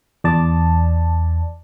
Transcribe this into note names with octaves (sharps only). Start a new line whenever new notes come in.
E2 D5 A5